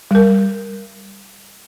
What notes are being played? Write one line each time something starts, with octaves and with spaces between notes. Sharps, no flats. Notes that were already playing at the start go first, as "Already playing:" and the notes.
G3 A#4